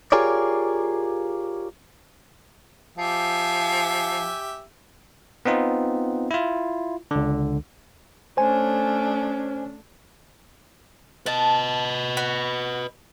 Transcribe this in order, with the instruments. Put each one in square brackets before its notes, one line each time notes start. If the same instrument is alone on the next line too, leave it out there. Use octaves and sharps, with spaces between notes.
[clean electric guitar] F4 G4 G#4 A#4 C#5 D5
[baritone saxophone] F3 [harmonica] G4 E5 G#5
[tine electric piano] B3 C4 D#4 F4
E4 F4
C#2 D3
[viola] A3 D4 [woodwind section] C#4 [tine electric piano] C5 G#5
[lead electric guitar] B4 D#5 [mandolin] A5
[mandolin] F#4 B5